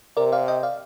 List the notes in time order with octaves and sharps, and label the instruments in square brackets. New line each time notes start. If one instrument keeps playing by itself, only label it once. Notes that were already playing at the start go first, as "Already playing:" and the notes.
[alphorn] C3 [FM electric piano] A#4 D5
[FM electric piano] D5 F5
D#5 G5
D5 F5